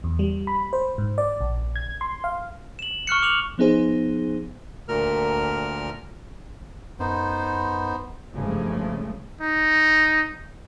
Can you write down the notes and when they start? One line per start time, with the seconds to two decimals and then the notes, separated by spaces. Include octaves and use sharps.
0.04 E2
0.19 G3
0.47 B5
0.73 C5
0.98 G#2
1.18 D5
1.41 A#1
1.76 G#6
2.01 C6
2.24 F5
2.79 E7 F#7
3.07 C#6 F6 F#6 C#7
3.22 D6 F7 F#7
3.58 F3 B3 D#4 G#4 C5
4.88 D2 A#2 A#4 F6
7.00 F#2 B3 D#4 C5
8.33 F#1 G2 C#3 F3 G#3 A3
9.41 D#4